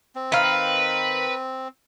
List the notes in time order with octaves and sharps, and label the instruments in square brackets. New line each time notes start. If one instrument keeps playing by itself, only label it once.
[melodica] C4
[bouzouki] D#3 F5 [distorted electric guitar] B4